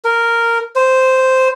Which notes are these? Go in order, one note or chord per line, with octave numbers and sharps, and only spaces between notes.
A#4
C5